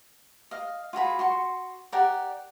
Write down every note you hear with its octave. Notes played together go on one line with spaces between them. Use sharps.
D#5 F5
F4 F#4 G#4 B5
F#4 C6 C#6
G4 A#4 D5 F#5